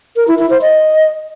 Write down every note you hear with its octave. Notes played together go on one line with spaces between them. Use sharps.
A#4
E4
E4
C5
D#5